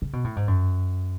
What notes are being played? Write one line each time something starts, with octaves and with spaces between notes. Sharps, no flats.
C#3
B2
A2
G#2
F#2